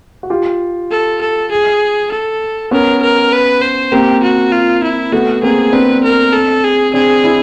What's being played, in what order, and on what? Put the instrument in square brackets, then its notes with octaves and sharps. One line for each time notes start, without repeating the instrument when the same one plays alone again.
[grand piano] F#4
F4 G4
[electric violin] A4
A4
G#4
A4
[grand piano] B3 C#4 [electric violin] A#4
[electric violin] A#4
B4
C5
[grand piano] A#3 C4 [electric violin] G4
[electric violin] F#4
F4
E4
[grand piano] A3 B3 [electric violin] F#4
[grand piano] A#3 C4 [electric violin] G#4
[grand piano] C4 D4 [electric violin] B4
[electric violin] A#4
A4
G#4
[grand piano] C4 D4 [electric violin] G#4
[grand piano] D4 E4